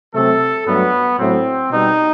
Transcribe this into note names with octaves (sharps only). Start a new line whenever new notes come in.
C3 F#3 A3 A4
G2 F#3 A3 B3
A2 F#3 A3 C4
B2 G3 D#4